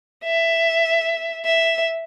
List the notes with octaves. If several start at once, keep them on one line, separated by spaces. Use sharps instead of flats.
E5
E5